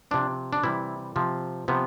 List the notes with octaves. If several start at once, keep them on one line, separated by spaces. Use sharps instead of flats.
C3 F3 D4
D4
C3 E3 G3 E4
C3 F3
C3 F3 B3